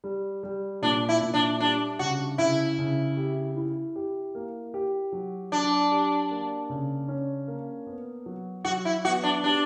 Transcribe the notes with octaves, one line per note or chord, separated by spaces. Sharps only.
G3
G3
A#2 D4
E4
A#2
D4
G3 D4
C#3 F#4
C#3 E4
C#3
G4
E4
G4
A#3
G4
F#3
F#3 D4
G4
A#3
C#3
C#4
A#3
B3
F#3
F#3 F#4
E4
B3 F#4
D4
D4 G4